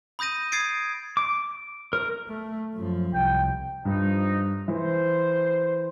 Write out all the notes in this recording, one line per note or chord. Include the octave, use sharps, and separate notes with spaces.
B5 D#6 G6 A#6 D#7
D#6 G#6 A6 C7 D7
D6
A#4
A3
F#2 F3
C2 G5
G2 F3 D#4
E3 C5